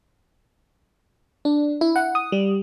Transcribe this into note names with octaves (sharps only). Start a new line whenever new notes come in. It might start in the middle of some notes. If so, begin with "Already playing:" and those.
D4
E4
F#5
D#6
G3